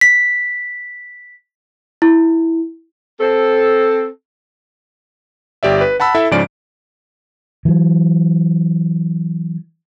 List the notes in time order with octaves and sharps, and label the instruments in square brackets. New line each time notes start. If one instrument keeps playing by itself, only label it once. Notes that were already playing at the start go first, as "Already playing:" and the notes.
[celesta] B6
E4
[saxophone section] C4 A4
[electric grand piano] G1 G4 D5 E5
B4
F#5 A5 B5 E6
E4 A4 E5
G#2 C#3 F3 C#4 D5 D7
[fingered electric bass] E3 F#3